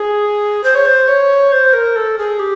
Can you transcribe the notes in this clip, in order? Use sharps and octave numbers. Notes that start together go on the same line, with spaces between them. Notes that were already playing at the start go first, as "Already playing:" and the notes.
Already playing: G#4
C5
C#5
C5
C#5
C5
A#4
A4
G#4
G4